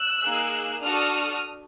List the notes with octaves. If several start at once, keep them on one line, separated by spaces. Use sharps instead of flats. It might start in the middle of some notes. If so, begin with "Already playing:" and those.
Already playing: E6 F#6
A#3 D#4 G#4
D4 F#4 A4 D#6 F6